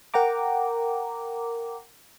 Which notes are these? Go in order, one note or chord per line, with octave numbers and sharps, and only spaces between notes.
A#4 F#5 G5 A#5 D6